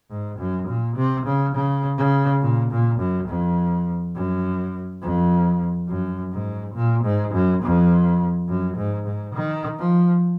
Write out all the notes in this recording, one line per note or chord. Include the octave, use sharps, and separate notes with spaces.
G#2
F#2
A#2
C3
C#3
C#3
C#3
A#2
A#2
F#2
F2
F#2
F2
F#2
G#2
A#2
G#2
F#2
F2
F#2
G#2
G#2
D#3
F3